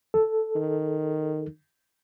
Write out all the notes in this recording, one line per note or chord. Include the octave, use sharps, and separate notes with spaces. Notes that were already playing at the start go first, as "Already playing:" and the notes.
A4
D#3